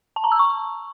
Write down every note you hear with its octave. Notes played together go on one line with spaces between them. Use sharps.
A5
A#5
E6
C#6